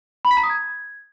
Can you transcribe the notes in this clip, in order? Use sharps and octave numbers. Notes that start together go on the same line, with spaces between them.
B5
B6
A#5
D#6
G#6